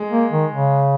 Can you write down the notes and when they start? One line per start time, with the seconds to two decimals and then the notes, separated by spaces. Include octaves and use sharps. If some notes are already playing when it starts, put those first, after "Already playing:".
Already playing: G#3
0.11 A#3
0.31 D#3
0.50 C#3